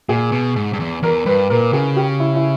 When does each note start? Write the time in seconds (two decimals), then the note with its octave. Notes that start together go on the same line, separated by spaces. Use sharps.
0.09 A#2 G#4
0.32 B2
0.56 G#2
0.73 G2
0.80 E2
1.03 E2 A#4
1.26 G2 B4
1.50 A#2 A#4
1.73 C#3 G#4
1.96 G4
2.20 E4
2.36 E4